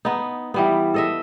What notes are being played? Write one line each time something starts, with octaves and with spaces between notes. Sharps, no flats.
B3 D#4
E3 G3 B3
A4 D#5 E5